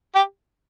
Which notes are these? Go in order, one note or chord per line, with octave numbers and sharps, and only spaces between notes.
G4